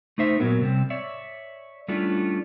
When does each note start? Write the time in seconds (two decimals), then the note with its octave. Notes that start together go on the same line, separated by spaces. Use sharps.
0.18 A3 D#4 C5 E5
0.39 A#2 D#3 F#3 B3 A#4
0.61 C3 G3 C4
0.90 C#5 D5 E5
1.88 G3 A3 C#4 D4 E4 F4